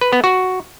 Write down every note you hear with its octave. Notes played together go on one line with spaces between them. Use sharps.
B4
B3
F#4